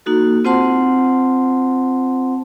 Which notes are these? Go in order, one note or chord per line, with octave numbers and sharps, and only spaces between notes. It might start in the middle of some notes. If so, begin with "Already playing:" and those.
A#3 D#4 F#4 A4
C4 F4 C5 F#5 A5 C6